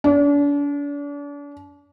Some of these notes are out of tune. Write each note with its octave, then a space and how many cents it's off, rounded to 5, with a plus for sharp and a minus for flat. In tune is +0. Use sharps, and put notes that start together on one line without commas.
D4 -40